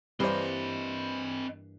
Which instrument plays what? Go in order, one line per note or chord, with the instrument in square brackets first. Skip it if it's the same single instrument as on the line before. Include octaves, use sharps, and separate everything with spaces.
[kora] G2 E3 A#3 [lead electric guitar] C4 D#5 [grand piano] B4 C5